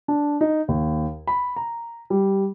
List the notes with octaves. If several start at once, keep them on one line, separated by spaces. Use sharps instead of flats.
D4
D#4
D#2
B5
A#5
G3